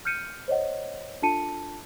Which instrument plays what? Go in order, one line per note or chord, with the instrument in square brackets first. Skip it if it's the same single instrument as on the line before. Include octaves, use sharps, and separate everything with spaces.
[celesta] F6 G6 C#7 D#7
C5 C#5 D#5 F#5
D4 F4 A4 A5 C#7 D#7